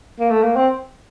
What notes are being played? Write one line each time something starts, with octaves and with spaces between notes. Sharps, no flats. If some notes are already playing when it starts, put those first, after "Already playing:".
A#3
A3
A#3
C4